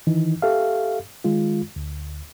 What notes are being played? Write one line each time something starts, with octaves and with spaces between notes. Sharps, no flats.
D#3 E3 D#4
G4 A4 E5 F5
D#3 G#3 F4
D2